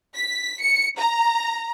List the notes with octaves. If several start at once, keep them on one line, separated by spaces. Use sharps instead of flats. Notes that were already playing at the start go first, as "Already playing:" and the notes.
B6
C#7
A#5